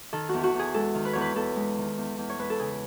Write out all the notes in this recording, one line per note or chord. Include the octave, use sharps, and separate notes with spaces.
D#3 A4
E2 F#4
F#4
E2
G#4
G#3 A4
D#3
B4
E2 C#5
B4
E2 A4
G#3
D#3
E2
E2
C#5
G#3 B4
A4
C#3 G#4